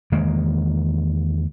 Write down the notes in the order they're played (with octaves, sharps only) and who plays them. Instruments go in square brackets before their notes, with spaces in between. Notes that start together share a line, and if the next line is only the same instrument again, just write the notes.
[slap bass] E2 D#3 G#3 A#3